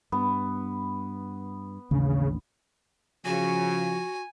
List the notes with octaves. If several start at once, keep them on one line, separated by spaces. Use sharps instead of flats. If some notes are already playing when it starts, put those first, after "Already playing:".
G2 B3
A1 D#2 C#3 D4
C#3 F3 F#4 G#5